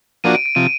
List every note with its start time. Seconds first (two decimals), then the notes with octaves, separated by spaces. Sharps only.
0.24 F3 A#3 D4 F#4 D#7
0.35 D7
0.46 D7
0.55 C3 F3 D#7